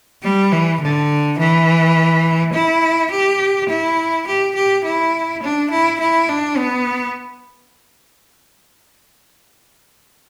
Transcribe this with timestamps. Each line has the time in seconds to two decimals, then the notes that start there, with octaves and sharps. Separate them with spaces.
0.23 G3
0.52 E3
0.81 D3
1.39 E3
2.54 E4
3.11 G4
3.70 E4
4.27 G4
4.55 G4
4.84 E4
5.42 D4
5.71 E4
6.00 E4
6.29 D4
6.57 B3